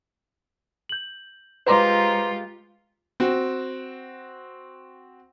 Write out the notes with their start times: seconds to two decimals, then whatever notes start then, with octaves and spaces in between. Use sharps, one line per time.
0.89 G6 F#7
1.66 G#3 F4 G4 B4 C5 A#5 C6 D6
3.20 C4 F#4